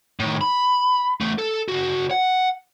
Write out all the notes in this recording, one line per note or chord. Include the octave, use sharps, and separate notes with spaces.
A2 D#3
B5
E2 A3
A4
C#3 F#4
F#5